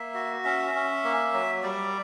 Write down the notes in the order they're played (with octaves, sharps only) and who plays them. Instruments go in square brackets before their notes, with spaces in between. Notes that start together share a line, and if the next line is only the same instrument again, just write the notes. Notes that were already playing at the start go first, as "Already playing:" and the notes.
Already playing: [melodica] A#3 E5
F#4
C#4 E5
C#4
A#3
F#3
G3 D5